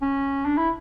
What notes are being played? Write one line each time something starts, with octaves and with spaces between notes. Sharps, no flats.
C#4
D4
E4